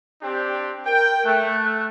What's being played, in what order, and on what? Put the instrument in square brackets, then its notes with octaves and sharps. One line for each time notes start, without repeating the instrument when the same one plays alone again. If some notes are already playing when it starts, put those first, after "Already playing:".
[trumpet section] C4 D4 G4
[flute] A#4 [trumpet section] G5
[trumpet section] A3 [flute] F#6